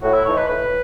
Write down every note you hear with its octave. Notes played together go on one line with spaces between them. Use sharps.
A2 F#4
E4
E3 A3 D#4 C#5
B4
A2 B4